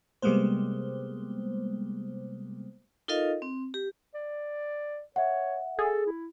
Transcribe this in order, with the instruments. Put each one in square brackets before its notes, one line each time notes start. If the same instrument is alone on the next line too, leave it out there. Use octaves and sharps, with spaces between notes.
[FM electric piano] C3 G3 G#3 A#3 B3 C5
[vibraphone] D#4 F4 A4 A#4 D#5 F5
C4
G4
[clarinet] D5
[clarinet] C#5 [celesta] E5 F#5
[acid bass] G#4 [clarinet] A4
[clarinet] E4